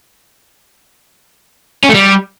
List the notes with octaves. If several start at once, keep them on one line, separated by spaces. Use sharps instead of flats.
C#4
A3
G3